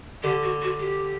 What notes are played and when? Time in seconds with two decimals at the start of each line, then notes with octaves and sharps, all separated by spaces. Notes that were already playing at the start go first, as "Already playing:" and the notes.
0.23 D3 G4
0.43 F#4
0.62 F#4
0.79 G4